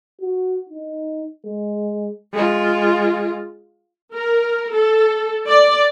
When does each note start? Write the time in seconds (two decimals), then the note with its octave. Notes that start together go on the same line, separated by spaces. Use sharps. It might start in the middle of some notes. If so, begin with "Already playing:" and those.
0.21 F#4
0.69 D#4
1.45 G#3
2.33 G#3 F4
4.14 A#4
4.74 A4
5.48 D5